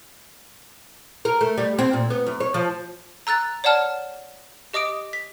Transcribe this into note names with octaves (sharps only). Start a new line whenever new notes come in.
A#4
A3
G3
C4
A#2
B3
F#2
C#5
F3
A#5 E6 F#6 A6
C#5 D5 F#5 A5 F6
G4 D#5 D6 D#6 D7
B6